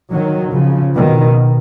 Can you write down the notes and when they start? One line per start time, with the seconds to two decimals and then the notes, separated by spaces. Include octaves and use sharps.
0.11 D#3 F#3
0.53 C#3 F3
0.96 B2 D#3